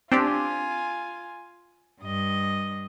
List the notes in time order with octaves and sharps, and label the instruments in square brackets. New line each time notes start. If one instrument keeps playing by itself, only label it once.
[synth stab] C4 D4 G4 [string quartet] F4 G#5
[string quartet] G2 D#5